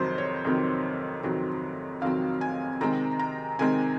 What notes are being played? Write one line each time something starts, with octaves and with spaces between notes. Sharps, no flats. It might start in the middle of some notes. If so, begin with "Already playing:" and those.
Already playing: F2 C3 D#3 F#3 C4 C5
C#5
F2 C3 D#3 F#3 C4
F2 C3 D#3 F#3 C4
F2 C3 D#3 F#3 C4 F5
G#5
C3 D#3 G#3 C4 A#5
A#5
C3 D#3 G#3 C4 G#5